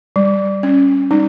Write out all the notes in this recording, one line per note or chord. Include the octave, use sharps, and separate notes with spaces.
G3
C#4
G3 D#4